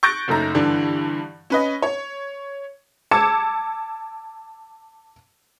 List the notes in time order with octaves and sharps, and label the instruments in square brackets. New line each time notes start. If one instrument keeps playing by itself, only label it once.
[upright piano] C#6 F#6 G6 A6 A#6 D7
F#1 F#2 A3 D#4 A#5
G2 D3 E3 D4
C#4 B4 D#5
C#5
[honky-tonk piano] A5 D6 E6 G#6 C#7 E7